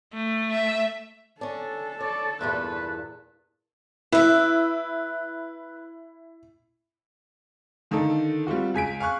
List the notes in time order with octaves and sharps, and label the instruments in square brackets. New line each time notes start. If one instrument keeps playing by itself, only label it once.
[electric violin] A3
[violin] E5
[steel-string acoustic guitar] C#4 D4 [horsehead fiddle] A4 A5
[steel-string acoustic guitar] C#5 [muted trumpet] D5
[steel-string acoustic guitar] E2 G2 A#2 [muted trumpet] B4
[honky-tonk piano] E4 [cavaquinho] B4 E5
[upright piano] D3 D#3 A#3 D#4 A4
G3 C4 F4 F#4
C#2 G#5 B6 D7
F5 G#5 C#6 F#6